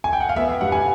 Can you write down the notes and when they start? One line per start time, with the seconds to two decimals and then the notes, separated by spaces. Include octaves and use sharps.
0.04 G#5
0.13 G5
0.20 F#5
0.29 F5
0.36 B3 E5
0.49 F5
0.61 G2 F#5
0.72 G#5